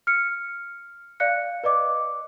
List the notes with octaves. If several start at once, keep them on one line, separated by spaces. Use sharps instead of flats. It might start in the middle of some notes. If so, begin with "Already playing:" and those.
F6 C#7
D5 F5 F#6 C#7
B4 D5 D#5 D6